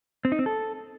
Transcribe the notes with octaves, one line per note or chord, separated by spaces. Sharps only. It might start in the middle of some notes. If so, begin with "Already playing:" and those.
C4
D#4
C4
A4